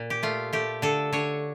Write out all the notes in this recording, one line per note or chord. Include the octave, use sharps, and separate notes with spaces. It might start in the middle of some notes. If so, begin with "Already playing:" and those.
Already playing: A#2
G4
A3 F4
A3 G4
D3 A4
D3 C#5